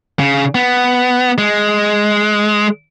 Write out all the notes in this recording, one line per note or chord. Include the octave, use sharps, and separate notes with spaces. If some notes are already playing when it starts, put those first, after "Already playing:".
C#3
B3
G#3